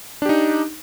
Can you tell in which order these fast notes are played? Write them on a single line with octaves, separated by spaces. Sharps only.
D4 G4 D#4